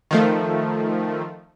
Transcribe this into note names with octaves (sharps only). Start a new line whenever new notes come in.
D#3 F3 A3